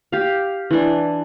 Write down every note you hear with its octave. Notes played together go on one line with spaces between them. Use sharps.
G4 F5
E3 D4